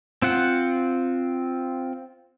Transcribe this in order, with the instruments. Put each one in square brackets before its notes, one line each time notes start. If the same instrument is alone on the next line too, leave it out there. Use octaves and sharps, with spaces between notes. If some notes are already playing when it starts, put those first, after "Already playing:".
[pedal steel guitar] C4 F4 F#5